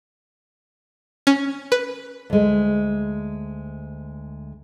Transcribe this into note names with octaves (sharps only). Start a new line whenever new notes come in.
C#4
B4
D2 G#3